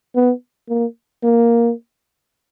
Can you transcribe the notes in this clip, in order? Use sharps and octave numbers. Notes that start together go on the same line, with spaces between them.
B3
A#3
A#3